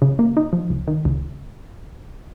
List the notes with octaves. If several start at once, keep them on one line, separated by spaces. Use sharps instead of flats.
C#3
A#3
D#4
F3
C#2
D#3
C#2